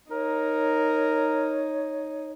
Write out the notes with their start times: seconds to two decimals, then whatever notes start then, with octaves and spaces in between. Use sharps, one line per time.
0.11 D#4 A#4 C#5